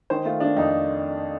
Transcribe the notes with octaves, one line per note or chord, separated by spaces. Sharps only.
D#3 C5
A3 F4
D#3 D4
F2 D#4